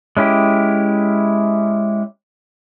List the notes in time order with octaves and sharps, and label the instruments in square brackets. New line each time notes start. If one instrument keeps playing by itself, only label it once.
[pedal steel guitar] G#3 C#4 E4 G4